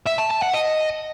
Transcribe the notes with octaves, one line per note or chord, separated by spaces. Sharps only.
E5
A5
A5
F#5
D#5